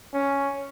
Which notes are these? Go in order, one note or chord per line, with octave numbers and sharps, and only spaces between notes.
C#4